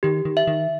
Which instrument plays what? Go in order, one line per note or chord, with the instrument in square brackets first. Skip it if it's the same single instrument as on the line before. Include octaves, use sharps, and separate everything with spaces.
[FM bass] D#3 [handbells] G4
[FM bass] D#3
[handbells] E5
[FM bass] D#3